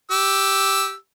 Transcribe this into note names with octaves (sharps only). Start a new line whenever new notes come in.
G4 E6